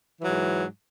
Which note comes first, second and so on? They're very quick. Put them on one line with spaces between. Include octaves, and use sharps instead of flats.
E3 F#3 G#2